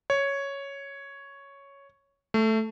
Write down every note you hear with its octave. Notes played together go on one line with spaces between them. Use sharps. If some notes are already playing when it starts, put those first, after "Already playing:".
C#5
A3